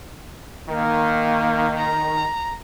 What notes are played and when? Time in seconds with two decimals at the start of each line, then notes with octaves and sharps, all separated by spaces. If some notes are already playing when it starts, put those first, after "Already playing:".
0.69 D#3 A#3
1.78 A#5